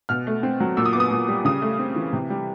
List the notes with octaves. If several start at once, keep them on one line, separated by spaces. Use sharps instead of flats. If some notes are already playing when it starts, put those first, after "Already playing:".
B2 F6
A3
C4
F#3
A#2 E6
D#6
B3 D6
D#6
A#2
G3
C#3 D#6
A3
C4
E3
C3
G3